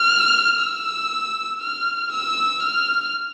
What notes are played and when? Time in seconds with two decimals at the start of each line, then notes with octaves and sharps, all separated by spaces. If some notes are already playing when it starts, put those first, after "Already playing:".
Already playing: F6
0.60 E6
1.61 F6
2.12 E6
2.63 F6